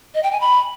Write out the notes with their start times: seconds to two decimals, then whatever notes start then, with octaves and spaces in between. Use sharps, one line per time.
0.14 D#5
0.23 G5
0.32 G#5
0.41 B5